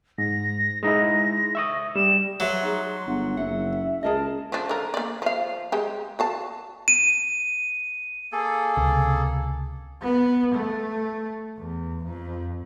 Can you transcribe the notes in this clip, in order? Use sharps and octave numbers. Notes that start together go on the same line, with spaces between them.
G#2 A#6
G#3 D#4 E4 A#6
E5 C#6 D#6
G3 E7
F#3 B4 E5 F#5 C6
D#4 G#4
G1 F#5
F#1 E5 F#5
C#2 G#4 A#4 D#5 A5
F3 D4
D3 A#4
A#3 D5
F3 F5
G#3 G4
F#4 F5 A5
D#7
A#3 G#4 A4
C#2 C3
B3
A3
E2
F2